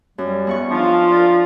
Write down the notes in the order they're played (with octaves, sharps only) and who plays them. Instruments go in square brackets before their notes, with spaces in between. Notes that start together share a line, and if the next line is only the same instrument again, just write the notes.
[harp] F#2 [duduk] G3
[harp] E2 F#5 C#6
[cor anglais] F3 [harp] D4 D#4 [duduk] F4
[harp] A#4 D5